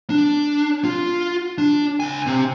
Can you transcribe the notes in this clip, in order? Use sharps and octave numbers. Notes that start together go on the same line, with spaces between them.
D4
F4
D4
C#2 G#5
C3 C4